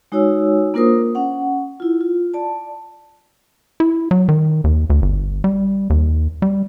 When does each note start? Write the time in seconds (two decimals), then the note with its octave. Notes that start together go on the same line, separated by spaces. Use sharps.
0.12 G#3 D#4 F#4 C#5 G#5 E6
0.74 A#3 D4 F4 A#4 C5 D#6
1.15 C#4 F#5
1.80 E4 F4
2.01 F4
2.34 D5 A5
3.80 E4
4.11 F#3
4.29 D#3
4.64 D#2
4.90 D2
5.02 G1
5.44 G3
5.90 D#2
6.42 G3